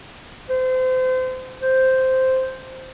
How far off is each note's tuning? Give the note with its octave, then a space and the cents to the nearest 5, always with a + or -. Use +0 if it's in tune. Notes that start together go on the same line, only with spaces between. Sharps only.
C5 -30
C5 -5